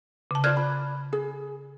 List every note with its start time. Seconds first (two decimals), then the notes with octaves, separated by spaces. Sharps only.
0.31 C#3 A5
0.44 F4 C5 D5 F6 F#6 G#6
0.57 B5
1.13 G#4